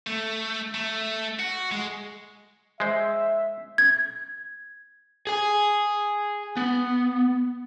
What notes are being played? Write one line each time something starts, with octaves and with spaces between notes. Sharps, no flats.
A3
A3
F#4
G#3
G#3 C5 E5
G#6
G#4 G#5
B3